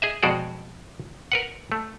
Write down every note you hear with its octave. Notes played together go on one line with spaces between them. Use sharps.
G#4 D#5 E5
F2 B2 G#3 F#4 C5 D5
A#4 B4 F#5
A3